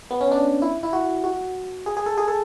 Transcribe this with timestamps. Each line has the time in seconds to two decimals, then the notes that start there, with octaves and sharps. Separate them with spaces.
0.11 B3
0.21 C#4
0.32 D4
0.62 E4
0.83 E4
0.93 F#4
1.24 F#4
1.86 G#4
1.97 G#4
2.06 A4
2.18 G#4
2.28 A4